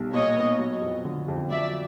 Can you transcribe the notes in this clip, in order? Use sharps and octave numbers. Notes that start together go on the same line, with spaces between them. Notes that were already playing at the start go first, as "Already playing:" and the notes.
Already playing: B1 G3
A#2 C#5 D#5
B3
F#3
F2
D3
F2
F#3 D5 E5